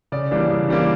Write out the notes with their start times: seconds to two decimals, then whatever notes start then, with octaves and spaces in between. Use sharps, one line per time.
0.12 C#3 D5
0.31 E3 G3 A#3 D4
0.50 C#3
0.69 E3 G3 A#3 D4